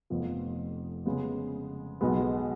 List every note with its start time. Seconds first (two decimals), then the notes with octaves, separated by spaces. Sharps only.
0.10 F1 F2 F3 B3
1.06 C#3 G#3 B3
2.01 B1 B2 G#3 B3